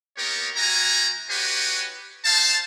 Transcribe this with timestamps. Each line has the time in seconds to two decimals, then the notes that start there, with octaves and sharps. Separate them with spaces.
0.18 A#3 B3 G4 A#4 C#5 D#5
0.56 G3 E4 F#4 G#5 A#5
1.30 D#4 F#4 G4 B4 C#5 G#5
2.25 D#4 C5 F5 A5